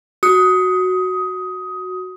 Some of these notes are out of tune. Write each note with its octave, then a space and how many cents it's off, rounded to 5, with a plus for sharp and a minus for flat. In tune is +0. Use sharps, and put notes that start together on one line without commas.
F#4 +0 D#6 +15